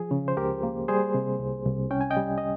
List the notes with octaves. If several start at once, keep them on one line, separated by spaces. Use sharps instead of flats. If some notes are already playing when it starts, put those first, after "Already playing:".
Already playing: F3 G#4
C#3
C5
C#2 G4 A#4
A#3
G3 G#4 C5
C3
C2
C2
C#4 G5
G#5
D#5 G5
G3
D#5